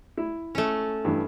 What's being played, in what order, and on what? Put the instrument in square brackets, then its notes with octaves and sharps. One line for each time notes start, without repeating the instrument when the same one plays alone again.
[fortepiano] E4
[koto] A3 C#4
[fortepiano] G2 E3